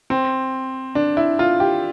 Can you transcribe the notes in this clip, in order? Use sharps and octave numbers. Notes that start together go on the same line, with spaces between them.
C4
D4
E4
F4
G4